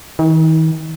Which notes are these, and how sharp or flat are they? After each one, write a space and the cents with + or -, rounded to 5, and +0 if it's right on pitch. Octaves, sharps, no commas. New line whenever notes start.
D#3 +45